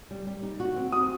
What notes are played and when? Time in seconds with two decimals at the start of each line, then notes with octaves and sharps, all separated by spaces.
0.11 G3
0.27 G3
0.43 D#4
0.60 F#4
0.76 C4
0.92 F#4 D#6